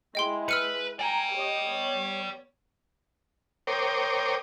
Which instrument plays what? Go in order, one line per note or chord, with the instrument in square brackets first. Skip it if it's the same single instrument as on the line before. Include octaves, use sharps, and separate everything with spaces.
[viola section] G#3 E4 [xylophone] D#5 G5 C6
[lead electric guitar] B4 [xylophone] E6 F6 C#7
[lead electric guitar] D5 G5 [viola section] G#5 A#5
[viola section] G4 C#5 D#5
B3 C#5
[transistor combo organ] A#4 C5 C#5 G5 D6 D#6